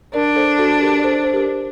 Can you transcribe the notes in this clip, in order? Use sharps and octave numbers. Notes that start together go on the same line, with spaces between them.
D4 A#4 D5
A4 C5
F#4 A4
G4 A#4
D5
A4 C5
C5
G4 A#4